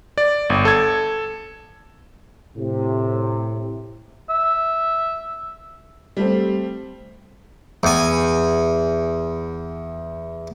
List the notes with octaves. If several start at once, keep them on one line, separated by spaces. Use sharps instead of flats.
D5
G1
A4 G#6
A2 C3
E5
G3 A3 C4
E2 G#5